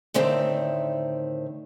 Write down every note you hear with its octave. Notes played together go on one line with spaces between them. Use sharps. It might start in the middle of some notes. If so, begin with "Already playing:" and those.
A2 D3 D#3 C4 E5